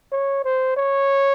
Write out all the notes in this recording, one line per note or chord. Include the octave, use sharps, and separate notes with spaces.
C#5
C5
C#5